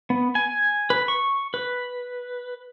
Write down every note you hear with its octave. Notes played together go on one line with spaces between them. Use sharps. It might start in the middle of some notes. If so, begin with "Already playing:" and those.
B3
G#5
B4
C#6
B4